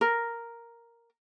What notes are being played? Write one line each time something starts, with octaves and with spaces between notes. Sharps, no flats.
A#4